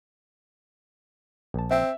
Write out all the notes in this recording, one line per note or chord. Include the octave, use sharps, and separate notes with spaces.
A#1 A5
C4 E5